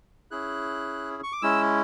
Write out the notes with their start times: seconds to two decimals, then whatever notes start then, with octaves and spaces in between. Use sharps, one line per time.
0.31 C#4 E4 G#4 F#6
1.23 C#6
1.33 D6
1.42 G#3 C#4 E4 E6